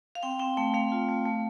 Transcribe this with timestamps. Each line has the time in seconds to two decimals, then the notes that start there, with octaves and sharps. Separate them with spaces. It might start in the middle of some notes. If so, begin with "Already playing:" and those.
0.15 F5
0.23 C4 G5
0.39 C4 G5
0.57 A3 G5
0.74 A3 F5
0.92 F4
1.09 A3
1.25 A3